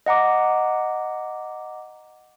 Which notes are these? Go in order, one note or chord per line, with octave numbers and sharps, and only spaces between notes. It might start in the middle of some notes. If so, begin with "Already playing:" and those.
D#5 F#5 A#5 D6